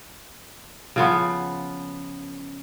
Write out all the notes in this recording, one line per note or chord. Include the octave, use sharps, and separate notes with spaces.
C#3 F3 B3